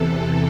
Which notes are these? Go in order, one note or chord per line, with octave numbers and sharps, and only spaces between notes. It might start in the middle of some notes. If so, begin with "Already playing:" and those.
Already playing: E2 C3 E3 A4